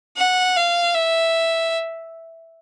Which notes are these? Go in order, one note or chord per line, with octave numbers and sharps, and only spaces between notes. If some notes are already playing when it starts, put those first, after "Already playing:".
F#5
F5
E5